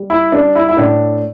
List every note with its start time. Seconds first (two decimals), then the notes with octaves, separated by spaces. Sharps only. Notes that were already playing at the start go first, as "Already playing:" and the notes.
Already playing: G3
0.10 E4
0.32 G3 D4
0.55 E4
0.69 E4
0.77 A2 D4